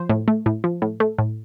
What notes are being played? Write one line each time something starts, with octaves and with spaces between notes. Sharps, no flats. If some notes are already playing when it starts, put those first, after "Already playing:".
Already playing: F3 C5
A2
A3
A2
F3
A2
A3
A2